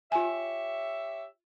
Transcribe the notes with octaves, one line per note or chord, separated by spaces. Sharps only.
F4 G4 C#5 E5 G#5